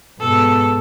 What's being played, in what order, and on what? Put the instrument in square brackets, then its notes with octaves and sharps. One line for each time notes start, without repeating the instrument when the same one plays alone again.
[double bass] G#2 B2 [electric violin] A4